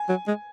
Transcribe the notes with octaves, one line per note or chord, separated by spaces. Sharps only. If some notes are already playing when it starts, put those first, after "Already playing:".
Already playing: G#5
F#3
G#3